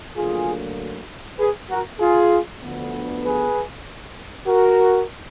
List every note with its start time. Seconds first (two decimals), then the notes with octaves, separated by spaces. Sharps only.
0.16 D2 D3 F#3 A#3 F4 G#4
1.39 G#4 B4
1.70 F#4 A#4
2.00 F4 G#4
2.63 D2 D3 F3 B3
3.24 G#4 B4
4.47 F#4 A#4